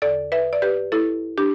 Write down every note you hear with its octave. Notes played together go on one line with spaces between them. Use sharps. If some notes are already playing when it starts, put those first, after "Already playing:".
E2 D3 A4 D5
B4 E5
D5
G4 B4
E4 A4
D4 G4